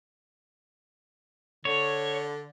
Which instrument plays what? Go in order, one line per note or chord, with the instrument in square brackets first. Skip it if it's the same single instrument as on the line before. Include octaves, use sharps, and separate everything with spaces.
[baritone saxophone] D3 [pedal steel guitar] C#5